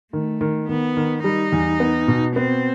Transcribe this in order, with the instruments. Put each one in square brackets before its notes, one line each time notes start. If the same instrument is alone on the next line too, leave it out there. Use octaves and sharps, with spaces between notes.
[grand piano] D#3 [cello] A3
[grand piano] D#3
[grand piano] D#3 [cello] B3
[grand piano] D#3
[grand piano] G3 [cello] D#4
[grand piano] E2
B3
B2
[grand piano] B3 [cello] C4